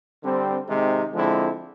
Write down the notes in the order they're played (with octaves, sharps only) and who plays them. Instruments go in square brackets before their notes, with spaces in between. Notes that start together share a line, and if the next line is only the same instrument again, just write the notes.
[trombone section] D3 G3 C4
C3 D#3 G#3 C4 D#4
D3 F3 G#3 C4 E4